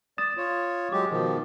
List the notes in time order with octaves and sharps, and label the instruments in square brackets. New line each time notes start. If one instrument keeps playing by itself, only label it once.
[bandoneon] D5 [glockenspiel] D#6 A6 E7
[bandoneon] F4 C#5
[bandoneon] F#3 G#3 G4 [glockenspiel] D6
[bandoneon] B2 D#3 F3